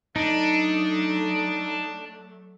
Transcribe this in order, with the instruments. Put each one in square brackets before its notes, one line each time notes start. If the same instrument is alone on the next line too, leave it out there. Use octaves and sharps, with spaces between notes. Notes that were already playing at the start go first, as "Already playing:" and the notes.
[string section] F#3 A3 [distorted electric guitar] D4 [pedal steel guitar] D#4